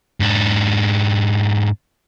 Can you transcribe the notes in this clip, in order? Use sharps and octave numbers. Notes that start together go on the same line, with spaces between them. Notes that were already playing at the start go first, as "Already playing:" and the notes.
G#2 D4